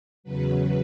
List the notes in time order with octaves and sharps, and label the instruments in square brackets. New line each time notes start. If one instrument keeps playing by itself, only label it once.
[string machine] E2 C#3 F#3 B4